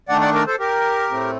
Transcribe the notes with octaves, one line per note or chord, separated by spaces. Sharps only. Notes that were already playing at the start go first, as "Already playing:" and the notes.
D#3 A3 D4 D5 F#5
D5 F#5
A#4 D5
A4 C5
G4 A#4
A2 A3 C4